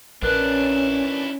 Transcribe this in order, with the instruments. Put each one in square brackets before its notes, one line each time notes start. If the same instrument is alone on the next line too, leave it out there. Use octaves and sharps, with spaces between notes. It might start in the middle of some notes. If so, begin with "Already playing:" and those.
[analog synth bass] A#1 [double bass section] C#4 [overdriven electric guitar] D4 E4 [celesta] A#4 B4 F#6